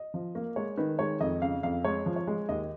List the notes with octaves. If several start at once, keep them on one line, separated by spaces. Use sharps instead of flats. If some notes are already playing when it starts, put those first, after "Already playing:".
Already playing: D#5
F3
A#3
G#3 C#5
D#3 B4
G#3 C#5
F2 D#5
C#3 F5
F2 F5
G#3 C#5
F3
C#5
G#3
D#2 D#5